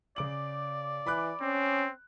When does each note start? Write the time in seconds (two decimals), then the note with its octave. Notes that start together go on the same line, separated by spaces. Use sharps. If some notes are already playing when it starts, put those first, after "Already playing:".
0.16 C#3 D5 D6 F#7
1.07 E3 B5 D6 F#6
1.41 C4 C#4